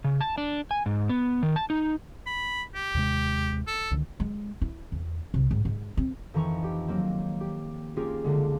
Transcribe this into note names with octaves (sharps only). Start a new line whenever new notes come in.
C#3
A5
D4
G#5
G#2
B3
D#3
A5
D#4
B5
G4
D#2 C3 G#3
A4
C#2 D3 D#3
G#3
E4
E2
C2
G#2
G#2
C4
F2 D#3 E3 A#5 C#6
G4
F#3 A#3 C4
G4
A#3 C#4 F4 G4 G#4
C#2 D3 G#3